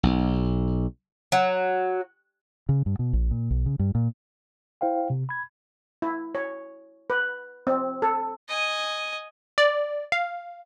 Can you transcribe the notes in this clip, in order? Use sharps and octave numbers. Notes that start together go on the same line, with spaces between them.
B1
F#3
C#3
G2
B2
A#1
A#2
B1
C#3
G2
A#2
E4 C5 F5 G5
C3
B5 G#6
E4
C#5
B4
C4
A4
D#5 G#5
D5
F5